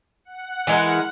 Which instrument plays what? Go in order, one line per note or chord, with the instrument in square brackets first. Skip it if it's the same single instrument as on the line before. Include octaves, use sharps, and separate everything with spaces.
[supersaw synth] F#5
[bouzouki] E3 G#3 A#4